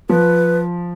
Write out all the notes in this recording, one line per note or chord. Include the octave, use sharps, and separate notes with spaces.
F3 B4